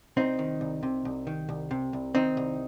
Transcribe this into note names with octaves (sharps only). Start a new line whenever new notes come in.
C2 C4 D#4
D#3
C2
C3
C2
D#3
C2
C3
C2
D#3 C4 D#4
C2